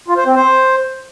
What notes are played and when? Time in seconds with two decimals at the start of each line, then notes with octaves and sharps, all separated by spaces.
0.08 F4
0.17 C5
0.26 C4
0.35 C5